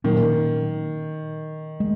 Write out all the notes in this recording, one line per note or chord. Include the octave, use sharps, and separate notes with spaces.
A#2 D#3 F#3 A#3 C#4
G#3